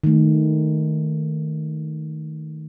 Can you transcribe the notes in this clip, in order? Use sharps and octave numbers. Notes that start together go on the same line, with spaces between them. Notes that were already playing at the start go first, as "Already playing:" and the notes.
D#3 A3